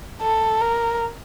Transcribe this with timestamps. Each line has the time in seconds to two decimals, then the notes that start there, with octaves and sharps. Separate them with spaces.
0.21 A4
0.61 A#4